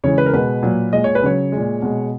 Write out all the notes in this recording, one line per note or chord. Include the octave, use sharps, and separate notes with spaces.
C#3 E3 G#3 C#5
B4
A#4
B2 G#3 B4
A#2 F#3
A#2 G#3 D#5
C#5
B4
C#3 F#3 C#5
A#2 G#3
B2 G#3